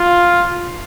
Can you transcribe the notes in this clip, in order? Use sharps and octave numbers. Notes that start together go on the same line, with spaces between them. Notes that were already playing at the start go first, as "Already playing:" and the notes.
Already playing: F4